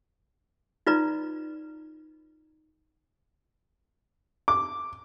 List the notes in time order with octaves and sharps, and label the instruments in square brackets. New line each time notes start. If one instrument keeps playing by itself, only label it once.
[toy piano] D#4 F4 B4 D5 A#5
[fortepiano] D6